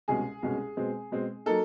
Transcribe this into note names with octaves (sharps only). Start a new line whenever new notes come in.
C2 B2 G#3 C#4 G#4
C2 B2 G#3 C#4
B2 G#3 C4
B2 G#3 C4
F#3 A#3 D#4 A4